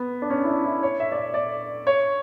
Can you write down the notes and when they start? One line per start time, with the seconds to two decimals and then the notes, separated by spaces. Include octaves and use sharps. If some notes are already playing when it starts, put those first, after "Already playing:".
Already playing: B3
0.22 D4
0.30 C#4
0.44 E4
0.48 D4
0.66 E4
0.83 C#5
1.00 E5
1.12 D5
1.17 E5
1.34 D5
1.87 C#5